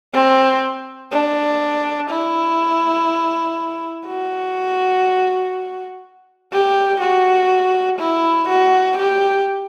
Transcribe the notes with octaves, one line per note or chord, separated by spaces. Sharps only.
C4
D4
E4
F#4
G4
F#4
E4
F#4
G4